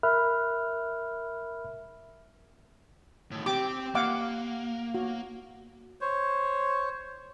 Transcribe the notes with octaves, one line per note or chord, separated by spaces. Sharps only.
A#4 E5 B5 F6 F#6
A2 D#3
C4 G4 G5 D6
A#3 F5 F#5 D6
F#4
C5 C#5